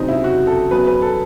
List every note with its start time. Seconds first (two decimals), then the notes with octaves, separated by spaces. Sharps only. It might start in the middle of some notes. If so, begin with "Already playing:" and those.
Already playing: F#1 E2 C3 F#3 C4 D#4
0.08 E4
0.24 F#4
0.47 A4
0.71 E2 B2 F#3 B4
0.87 B4
1.02 A4